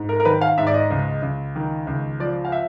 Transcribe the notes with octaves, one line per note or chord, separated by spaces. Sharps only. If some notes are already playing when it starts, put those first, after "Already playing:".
Already playing: G#2
A#4
A#4
D#3 B4
F5
G#2 E5
D5
D#5
C#2
C#2
D#3
C#2
F3 D5
F5
E5